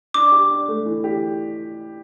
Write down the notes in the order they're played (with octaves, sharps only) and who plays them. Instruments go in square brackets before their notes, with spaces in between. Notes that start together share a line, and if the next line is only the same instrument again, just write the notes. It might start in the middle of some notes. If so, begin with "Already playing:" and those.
[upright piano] D4 [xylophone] D6
[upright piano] G4
D4
A3
E3
G4